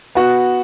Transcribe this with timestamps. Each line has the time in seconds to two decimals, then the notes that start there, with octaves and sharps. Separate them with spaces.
0.15 B3 F#4